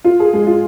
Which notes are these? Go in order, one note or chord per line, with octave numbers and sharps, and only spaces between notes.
F4
G#4
G#3
F4